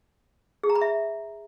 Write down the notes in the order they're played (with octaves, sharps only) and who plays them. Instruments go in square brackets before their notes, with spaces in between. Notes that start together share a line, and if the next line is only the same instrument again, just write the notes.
[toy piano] G#4
A#5
B5
E5